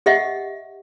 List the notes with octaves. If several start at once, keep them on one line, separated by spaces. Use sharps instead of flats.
G4 D#5 E5 F#5